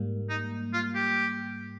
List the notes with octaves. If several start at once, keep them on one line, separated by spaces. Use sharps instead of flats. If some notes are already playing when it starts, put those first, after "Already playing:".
Already playing: G#2 G3 A#3
D#4
F4
G4